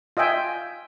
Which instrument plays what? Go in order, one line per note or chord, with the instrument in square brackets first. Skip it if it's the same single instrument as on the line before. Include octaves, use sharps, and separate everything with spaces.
[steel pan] F4 D#5 E5 G5 G#5